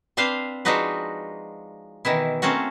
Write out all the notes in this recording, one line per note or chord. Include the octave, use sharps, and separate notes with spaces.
C4 D4 B4 C5 F5
F3 G#3 D4 D#4 F#4 B4
B2 D#3 E3 E4
A3 A#3 C4 C#4 F#4